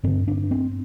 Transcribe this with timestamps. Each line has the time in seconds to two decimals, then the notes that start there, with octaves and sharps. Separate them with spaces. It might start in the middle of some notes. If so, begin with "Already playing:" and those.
0.03 G2 D3 C4
0.28 D4
0.51 C4